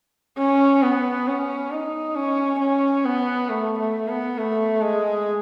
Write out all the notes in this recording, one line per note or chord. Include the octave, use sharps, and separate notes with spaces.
C#4
B3
C#4
D#4
C#4
C#4
B3
A3
A3
B3
A3
G#3